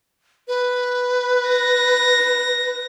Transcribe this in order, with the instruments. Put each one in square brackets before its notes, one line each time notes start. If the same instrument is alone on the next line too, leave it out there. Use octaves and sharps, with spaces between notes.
[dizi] B4
[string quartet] A#6